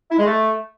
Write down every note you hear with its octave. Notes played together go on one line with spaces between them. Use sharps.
E4
G#3
A3